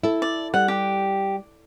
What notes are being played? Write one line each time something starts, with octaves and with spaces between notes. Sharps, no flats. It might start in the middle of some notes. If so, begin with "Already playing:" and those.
E4 A4
D5
G3 F#5
G4